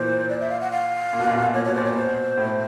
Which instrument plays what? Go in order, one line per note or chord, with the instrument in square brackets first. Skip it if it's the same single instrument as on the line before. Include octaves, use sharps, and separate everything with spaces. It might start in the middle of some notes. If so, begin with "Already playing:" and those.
Already playing: [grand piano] A#2 E3 [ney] C5
[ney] D5
E5
F5
F#5
F5
[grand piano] A#2
B2
A#2
B2
A#2
[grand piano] A#2 [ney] C#5
[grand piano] B2 [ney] C#5
[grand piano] A#2 [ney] C5
[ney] C#5
B4
[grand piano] B2 [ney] C5
[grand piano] A2